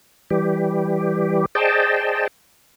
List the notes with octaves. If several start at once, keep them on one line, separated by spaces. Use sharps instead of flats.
E3 G3 G4
G#4 C5 D5 D#5 G5 A5